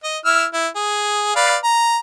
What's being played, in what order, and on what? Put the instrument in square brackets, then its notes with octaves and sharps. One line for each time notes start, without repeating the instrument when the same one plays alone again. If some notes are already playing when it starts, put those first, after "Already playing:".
[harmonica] D#5
E4 E6 F6
E4
G#4
B4 D5 F5
A#5